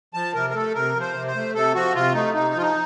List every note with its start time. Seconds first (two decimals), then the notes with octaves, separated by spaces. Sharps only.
0.14 F3 A5
0.34 C3 A#4
0.50 A#4
0.54 A3 A4
0.74 C3 A#4
0.94 F3
1.00 C5
1.14 C3
1.27 C5
1.35 A3
1.54 C3 A4
1.75 F3 F#4
1.95 C3 F4
2.14 A3 D#4
2.34 C3 D#4
2.54 F3 F4
2.62 D#4